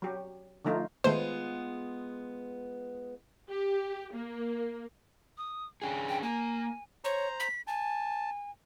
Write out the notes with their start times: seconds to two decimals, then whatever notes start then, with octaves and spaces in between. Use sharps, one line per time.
0.02 F#3 G4
0.65 D3 F3 A3 D#4 F4
1.04 D#3 G#3 A3 B3 F4 C5
3.50 G4
4.13 A#3
5.38 D#6
5.82 C#4 D4 G#4 G5
6.09 G5
6.23 A#3 G#5
7.04 C5 C#5 A#5
7.40 B6
7.67 G#5 A5